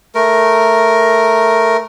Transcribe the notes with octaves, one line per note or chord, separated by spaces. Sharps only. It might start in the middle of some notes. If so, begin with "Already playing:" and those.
A3 A#4